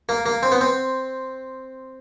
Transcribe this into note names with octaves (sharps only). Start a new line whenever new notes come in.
A#3
A#3
C4
B3
C4